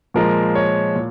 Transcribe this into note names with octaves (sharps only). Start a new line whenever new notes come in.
A#2 F3 G#3 A#4
C#5
A#2